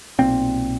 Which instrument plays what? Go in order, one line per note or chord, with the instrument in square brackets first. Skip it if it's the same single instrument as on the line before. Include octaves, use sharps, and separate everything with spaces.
[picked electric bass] B1 A#2 C4